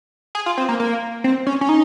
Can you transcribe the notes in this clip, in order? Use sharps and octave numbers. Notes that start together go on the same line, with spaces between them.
G#4
F4
C4
A#3
A#3
C4
C#4
C#4
D#4